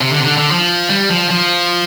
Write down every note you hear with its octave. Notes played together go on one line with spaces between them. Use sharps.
C3
D3
C3
D3
D3
F3
G3
F3
F3